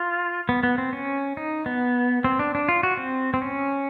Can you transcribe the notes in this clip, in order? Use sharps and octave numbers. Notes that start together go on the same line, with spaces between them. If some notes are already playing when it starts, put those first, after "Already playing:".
Already playing: F4
B3
B3
C4
C#4
D#4
B3
C4
D4
D4
F4
F#4
C4
C4
C#4